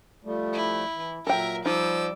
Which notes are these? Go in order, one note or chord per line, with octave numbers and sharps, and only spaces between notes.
F3 G3 A3
E4
E3
A#2 F#3 A4 A#4 E5 G5
F3 G3 D#4 D6 E6